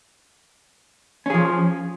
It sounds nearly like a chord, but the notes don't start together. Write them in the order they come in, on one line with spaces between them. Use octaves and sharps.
C#4 G#4 F3